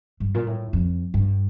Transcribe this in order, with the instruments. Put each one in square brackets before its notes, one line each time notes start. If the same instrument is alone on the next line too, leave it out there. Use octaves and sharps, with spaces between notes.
[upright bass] G2
A#2
A2
F2
G2